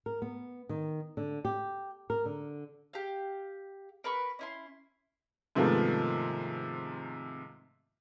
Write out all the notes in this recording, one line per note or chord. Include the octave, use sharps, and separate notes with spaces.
A#4
B3
D#3
D3
G4
A#4
D3
G4 F5
A#4 B4 B5 C#6
C#4 E4 C6
G#2 C3 D#3 F3 A3 B3